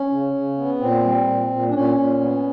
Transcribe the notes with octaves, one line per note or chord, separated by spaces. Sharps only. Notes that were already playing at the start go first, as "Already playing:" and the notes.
Already playing: C#4
C#3
C#3
B3
A#2 C4
G3
A#2
A#2
D4
A#2 C#4
A#2
B3